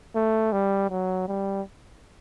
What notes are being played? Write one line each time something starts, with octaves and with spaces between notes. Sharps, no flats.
A3
G3
F#3
G3